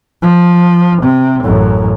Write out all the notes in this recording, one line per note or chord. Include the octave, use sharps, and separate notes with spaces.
F3
C3
A1 F#2